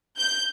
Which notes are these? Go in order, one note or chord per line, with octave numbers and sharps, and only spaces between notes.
G6